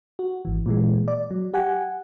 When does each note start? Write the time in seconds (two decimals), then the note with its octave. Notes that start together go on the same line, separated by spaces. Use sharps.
0.19 F#4
0.45 G#1 E3
0.66 A#2 E3 G#3
1.08 D5
1.31 F#3
1.54 G4 F#5 G#5